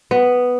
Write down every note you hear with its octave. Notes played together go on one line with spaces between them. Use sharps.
B3